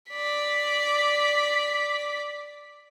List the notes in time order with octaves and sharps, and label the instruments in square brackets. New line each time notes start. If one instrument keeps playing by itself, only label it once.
[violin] D5 B6